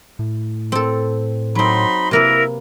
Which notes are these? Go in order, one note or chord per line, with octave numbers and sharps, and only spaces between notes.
A2
C4 A4
F#3 C4 D#4 B5 C6
C3 A#3 E4 A#4 B4